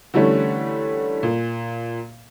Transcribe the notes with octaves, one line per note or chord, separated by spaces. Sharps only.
D3 E3 G3 A3 C#4
A#2